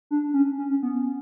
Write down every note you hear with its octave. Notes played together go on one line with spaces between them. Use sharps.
D4
C#4
C#4
C#4
B3
B3